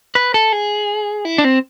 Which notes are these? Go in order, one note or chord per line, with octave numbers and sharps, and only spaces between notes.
B4
A4
G#4
E4
D4
C4